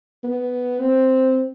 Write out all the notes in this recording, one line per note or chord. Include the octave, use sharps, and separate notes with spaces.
B3
C4